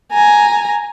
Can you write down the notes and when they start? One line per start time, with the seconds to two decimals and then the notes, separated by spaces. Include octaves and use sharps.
0.13 G#5 A#5